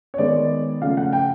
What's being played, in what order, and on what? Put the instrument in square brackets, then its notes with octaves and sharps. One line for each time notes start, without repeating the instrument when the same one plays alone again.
[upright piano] C#5
D#3 G#3 B3 D5
C#3 F3 A3 F5
F#5
G5